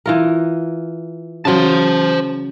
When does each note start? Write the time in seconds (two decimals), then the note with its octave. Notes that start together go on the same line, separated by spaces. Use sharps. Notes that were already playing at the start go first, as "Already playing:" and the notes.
0.06 E3 F4 A#4
1.45 C#3 F#3 C5 A5